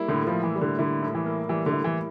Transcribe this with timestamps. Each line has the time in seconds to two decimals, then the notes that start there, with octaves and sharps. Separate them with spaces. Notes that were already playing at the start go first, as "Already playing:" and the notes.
Already playing: G3 A#3 E4
0.08 A2 D3
0.27 F3
0.33 A#3
0.43 E3
0.55 G3
0.61 D3
0.79 D3 E4
1.02 A2
1.15 E3
1.26 A#3
1.49 E3 G3
1.66 D3
1.73 E4
1.84 E3